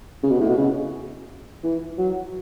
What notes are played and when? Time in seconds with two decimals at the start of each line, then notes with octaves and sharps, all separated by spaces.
0.23 C#3
0.31 B2
0.40 A2
0.49 B2
0.58 C#3
1.64 E3
1.98 F#3